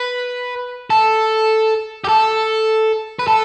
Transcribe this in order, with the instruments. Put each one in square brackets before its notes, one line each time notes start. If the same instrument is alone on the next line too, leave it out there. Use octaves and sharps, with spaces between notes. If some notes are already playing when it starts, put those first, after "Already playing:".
Already playing: [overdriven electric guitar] B4
A4
G4
A4
B4
A4